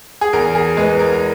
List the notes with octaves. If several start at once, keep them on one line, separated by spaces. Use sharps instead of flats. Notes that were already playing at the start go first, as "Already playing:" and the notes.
G#4
E2 A#4
G#4
G#3 B4
A#4
A#4